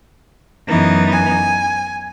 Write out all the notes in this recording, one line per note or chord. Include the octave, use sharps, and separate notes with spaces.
F#2 E3 B3 D#4
G#5